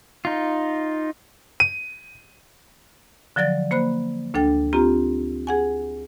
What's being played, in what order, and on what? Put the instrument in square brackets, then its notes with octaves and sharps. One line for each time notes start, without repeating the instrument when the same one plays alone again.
[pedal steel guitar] D#4 F4
[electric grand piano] D#7
[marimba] D3 F3 F#3 D5 A6
A#3 C5 B5 F#6
D2 D4 A4 G5
C4 F4 G4 A#5
G#4 F#5 G#5